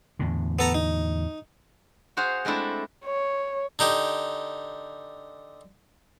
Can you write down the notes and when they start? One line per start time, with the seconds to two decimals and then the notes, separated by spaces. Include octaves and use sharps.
0.19 E2 A2 D3
0.59 B3 A4 A#5
0.74 D#4
2.17 F#4 G#4 C5 F5 F#5
2.45 G#3 A3 C4 D4 E4 A4
3.05 C#5
3.79 D3 D#4 G4